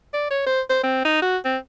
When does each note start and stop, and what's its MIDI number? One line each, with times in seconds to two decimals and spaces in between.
0.14 0.30 74
0.31 0.42 73
0.46 0.61 72
0.70 0.80 72
0.84 1.01 60
1.05 1.18 63
1.22 1.37 66
1.45 1.58 60